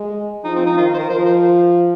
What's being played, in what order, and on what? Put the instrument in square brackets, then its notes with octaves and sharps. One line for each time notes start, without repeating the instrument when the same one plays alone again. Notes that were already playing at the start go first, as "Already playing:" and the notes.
Already playing: [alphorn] G#3
[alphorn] F3 [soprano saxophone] D#4
[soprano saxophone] C4
D#4
[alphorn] D#3 [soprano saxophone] F4
[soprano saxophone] C5
A#4
[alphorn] F3 [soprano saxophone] C5
[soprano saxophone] A#4
C5